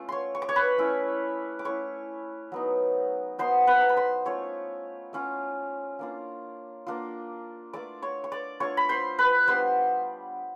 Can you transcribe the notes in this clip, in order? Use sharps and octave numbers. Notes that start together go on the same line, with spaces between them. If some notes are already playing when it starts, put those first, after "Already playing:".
Already playing: A3 C#4 F4
C#5 C6 C#6
C#6
D6
C#5 C#6
B4 B5
A3 C#4 E4
D6
A3 C#4 E4 C#5 C#6
F#3 B3 D#4
F#3 B3 D#4 C5 C6
B4 B5
A#5
B5
C5 C6
A3 C#4 F4 C#5 C#6
A3 C#4 F4
A#3 D4 F4
A#3 D4 F4
A3 D4 F4 D5 D6
C#5 C#6
C#6
D5 D6
A3 D4 F4 C#5 C#6
B5
C5 C6
B4 B5
G3 B3 D4 C5 C6